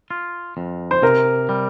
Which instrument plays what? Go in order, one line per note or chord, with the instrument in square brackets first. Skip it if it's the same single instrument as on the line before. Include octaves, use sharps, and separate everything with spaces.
[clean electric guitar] F4
F2
[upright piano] C5
[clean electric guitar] C3 [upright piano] A#4
[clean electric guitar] G3